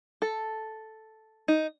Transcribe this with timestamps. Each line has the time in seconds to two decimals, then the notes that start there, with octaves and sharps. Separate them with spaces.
0.22 A4
1.48 D#4